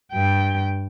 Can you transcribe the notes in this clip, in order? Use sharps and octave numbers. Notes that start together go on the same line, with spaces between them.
G2 G5